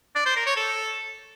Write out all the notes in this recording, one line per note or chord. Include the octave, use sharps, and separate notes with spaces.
D5
C5
A#4
C#5
A4